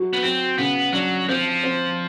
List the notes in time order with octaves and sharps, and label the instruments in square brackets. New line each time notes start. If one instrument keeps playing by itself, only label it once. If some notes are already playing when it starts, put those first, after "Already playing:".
Already playing: [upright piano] F#3
[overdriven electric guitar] B3
[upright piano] F#3 [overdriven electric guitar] C4
[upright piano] C#3 [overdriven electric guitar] B3
[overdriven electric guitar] F#3 [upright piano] D4
[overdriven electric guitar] F3 [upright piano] C4
[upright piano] C4